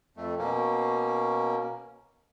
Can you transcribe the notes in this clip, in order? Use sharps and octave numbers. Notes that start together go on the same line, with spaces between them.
F2 A3
B2 A#3 C#4